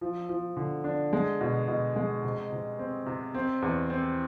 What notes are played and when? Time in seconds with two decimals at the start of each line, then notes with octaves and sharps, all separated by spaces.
0.01 F3
0.29 F3
0.57 D3
0.84 D4
1.13 G#3
1.41 B2
1.68 B2
1.96 G#3
2.24 C3
2.52 C3
2.79 C4
3.06 C3
3.34 C4
3.62 E2
3.90 C4